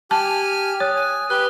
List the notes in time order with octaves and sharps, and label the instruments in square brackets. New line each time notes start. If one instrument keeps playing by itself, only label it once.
[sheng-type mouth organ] G4 G#5 F6 [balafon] A5
[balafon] C#5 [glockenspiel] D#6 F#6
[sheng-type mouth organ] G#5
[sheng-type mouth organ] G4 B4 [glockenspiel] F#6 G7